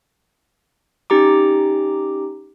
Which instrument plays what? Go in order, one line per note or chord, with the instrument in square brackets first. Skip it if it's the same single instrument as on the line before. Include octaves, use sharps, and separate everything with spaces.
[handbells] C#4 D#4 G4 A#5 D6